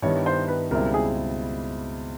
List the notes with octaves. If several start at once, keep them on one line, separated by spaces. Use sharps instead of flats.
G2 D#3 G3 B3 E4 C#5
C5
B4
C#2 B2 G3 C4 E4 A#4
G#4